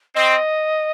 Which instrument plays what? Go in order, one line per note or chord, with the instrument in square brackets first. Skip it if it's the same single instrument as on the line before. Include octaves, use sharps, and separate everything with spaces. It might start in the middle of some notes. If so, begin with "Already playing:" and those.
[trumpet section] C4 [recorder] D#5